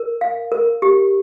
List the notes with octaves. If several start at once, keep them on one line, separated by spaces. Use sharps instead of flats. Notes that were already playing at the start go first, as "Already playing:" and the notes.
Already playing: A#4
F5
A#4
G4